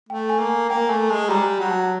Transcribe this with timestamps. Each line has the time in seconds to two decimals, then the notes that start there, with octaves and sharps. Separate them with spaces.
0.09 A3 G5
0.29 G#5
0.39 A#3
0.49 G#5
0.69 A#3 G5
0.89 A3 G#5
1.10 G#3 A5
1.30 G3 A#5
1.60 F#3
1.71 A5